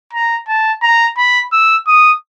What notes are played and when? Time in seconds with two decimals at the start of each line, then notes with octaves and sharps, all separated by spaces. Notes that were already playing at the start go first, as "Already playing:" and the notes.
0.13 A#5
0.48 A5
0.83 A#5
1.18 B5
1.52 E6
1.87 D#6